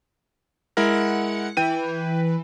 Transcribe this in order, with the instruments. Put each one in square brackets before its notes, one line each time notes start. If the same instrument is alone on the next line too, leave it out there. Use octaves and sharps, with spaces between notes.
[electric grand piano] G#3 E4 A#4 [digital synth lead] F#5
[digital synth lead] E3 [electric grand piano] G5 D#7